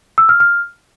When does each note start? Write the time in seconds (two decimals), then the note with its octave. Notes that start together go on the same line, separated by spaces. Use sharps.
0.18 E6
0.29 F6
0.40 F6